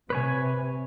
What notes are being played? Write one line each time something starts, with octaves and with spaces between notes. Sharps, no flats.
C3 B4 C#5 G#5